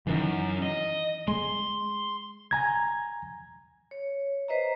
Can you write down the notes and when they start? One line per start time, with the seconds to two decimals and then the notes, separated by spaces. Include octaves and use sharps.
0.07 F#2 D#3 E3
0.62 D#5
1.28 G#3 C6
2.51 G#5 A#5 G#6
3.91 C#5
4.48 B4 C5 D#5 E5 A#5